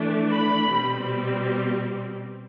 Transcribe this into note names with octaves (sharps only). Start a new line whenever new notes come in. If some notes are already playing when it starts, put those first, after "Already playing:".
Already playing: E3 A3 D4
B5
B2 G3 C4